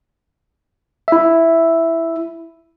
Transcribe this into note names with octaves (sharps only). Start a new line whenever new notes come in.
E4 E5